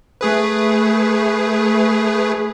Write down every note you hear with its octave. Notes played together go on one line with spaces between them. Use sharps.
A3 G#4 B4